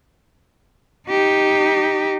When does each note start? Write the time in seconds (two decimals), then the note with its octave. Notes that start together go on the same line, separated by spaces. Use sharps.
1.08 D#4 G4